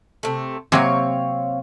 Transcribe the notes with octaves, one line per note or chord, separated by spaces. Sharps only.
C3 A3
C3 F#3 A#3 C4 C#5 F5